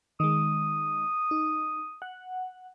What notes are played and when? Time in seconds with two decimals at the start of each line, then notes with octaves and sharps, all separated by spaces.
0.20 D#3 G#3 D#6
1.31 D#4
2.02 F#5